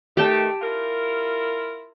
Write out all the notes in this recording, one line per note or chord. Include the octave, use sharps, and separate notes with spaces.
D#3 A3 G4 G5 A5
E4 F4 A#4